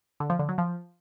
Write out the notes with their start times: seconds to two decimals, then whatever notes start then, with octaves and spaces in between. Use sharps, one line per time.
0.20 D3
0.30 F3
0.39 D3
0.49 F#3
0.58 F3